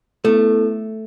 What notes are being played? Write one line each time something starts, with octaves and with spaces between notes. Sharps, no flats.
A3 B3 E4 A4